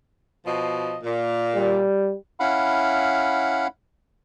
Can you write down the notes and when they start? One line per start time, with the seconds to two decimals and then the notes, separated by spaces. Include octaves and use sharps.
0.45 B2 F3 D#5
1.03 A#2
1.55 G3
2.40 C#4 E4 F5 F#5 B5